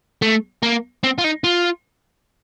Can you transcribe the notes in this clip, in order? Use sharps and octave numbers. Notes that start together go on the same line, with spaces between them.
A3
A#3
C4
F4
D#4
F4